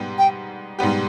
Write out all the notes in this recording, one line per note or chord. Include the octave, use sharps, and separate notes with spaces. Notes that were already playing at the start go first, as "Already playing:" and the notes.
Already playing: G#2 G3 B3 G4
G5
G#2 G3 B3 G4